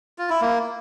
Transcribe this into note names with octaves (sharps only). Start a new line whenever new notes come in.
F4
E4
A#3